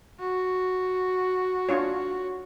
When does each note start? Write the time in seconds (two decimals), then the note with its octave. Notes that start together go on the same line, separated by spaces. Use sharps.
0.20 F#4
1.69 D4 F4 C#5